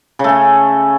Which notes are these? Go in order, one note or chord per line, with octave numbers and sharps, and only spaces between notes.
C#3 A3 C#4